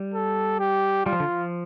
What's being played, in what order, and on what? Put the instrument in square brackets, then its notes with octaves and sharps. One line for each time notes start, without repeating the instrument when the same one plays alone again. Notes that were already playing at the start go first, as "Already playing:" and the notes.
Already playing: [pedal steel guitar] G3
[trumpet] A4
G4
[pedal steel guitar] G3 [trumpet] F4
[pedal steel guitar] F3
D3
F3